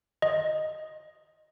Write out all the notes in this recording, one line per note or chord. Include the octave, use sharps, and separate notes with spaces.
D#5